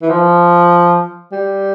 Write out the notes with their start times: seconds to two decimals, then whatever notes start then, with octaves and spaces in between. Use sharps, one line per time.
0.02 E3
0.10 F3
1.32 G3